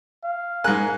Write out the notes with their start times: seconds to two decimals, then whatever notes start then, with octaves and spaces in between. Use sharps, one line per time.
0.24 F5
0.64 G#2 G#4 A#4 G#5 F#6